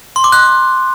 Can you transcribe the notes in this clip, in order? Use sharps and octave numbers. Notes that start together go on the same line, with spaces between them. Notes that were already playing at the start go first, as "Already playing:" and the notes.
C6
D6
F#6